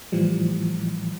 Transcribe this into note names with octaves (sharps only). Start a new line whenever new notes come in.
A2 E3 F3 G3